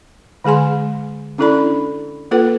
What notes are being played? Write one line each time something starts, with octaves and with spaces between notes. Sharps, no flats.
D3 G#3 G#4 G#5 C6
C#4 D4 E4 A4 D5 B5
A#3 F4 A4 B4 F#5